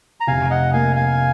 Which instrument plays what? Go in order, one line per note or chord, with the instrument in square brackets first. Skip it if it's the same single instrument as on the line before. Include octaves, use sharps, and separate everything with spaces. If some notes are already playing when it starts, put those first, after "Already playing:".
[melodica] A#5
[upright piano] F1 [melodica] F5 G#5
[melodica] D#5 F#5
[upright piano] A#3 [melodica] F5 G#5
[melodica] F5 G#5